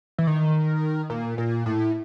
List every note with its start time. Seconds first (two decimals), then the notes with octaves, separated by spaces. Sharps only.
0.18 E3
0.27 D#3
1.10 A#2
1.38 A#2
1.66 A2